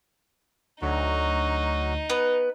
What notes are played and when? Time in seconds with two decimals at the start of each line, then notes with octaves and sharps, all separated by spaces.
0.82 D2 F#3 D#4 F#4
2.10 B3 B4